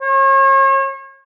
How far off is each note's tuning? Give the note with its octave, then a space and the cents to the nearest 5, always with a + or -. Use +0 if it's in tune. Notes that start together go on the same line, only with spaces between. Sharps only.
C#5 -40